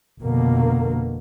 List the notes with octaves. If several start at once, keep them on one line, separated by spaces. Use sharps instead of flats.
F1 B2 D3 A#3